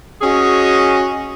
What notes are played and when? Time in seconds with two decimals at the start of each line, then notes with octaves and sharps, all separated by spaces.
0.22 C#4 F#4 G#4 D#5